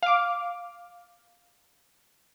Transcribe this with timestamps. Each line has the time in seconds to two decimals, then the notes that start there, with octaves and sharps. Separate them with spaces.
0.03 F5 D6